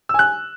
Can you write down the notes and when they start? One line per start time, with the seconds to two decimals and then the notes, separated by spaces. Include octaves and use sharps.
0.09 E6
0.14 G#5
0.19 F#6